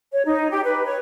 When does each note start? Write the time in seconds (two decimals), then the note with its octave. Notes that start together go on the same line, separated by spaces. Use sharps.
0.12 C#5
0.25 D#4
0.50 G4
0.66 B4
0.85 C#5